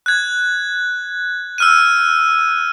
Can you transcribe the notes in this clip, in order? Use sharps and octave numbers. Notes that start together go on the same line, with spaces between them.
F#6 G#6
E6 F6 D#7